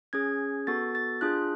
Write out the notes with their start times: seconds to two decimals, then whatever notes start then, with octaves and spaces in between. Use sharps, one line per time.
0.13 C#4 G#4 G#6
0.67 B3 F#4 A4 A6
0.95 A6
1.21 D4 F4 G#4 F#6